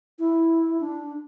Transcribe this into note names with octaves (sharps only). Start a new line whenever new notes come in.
E4
D4